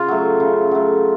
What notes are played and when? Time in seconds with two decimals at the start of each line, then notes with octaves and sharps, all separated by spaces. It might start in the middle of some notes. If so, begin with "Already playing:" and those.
Already playing: C#3 F4
0.08 F#3 A3
0.40 C#3
0.71 F#3 A3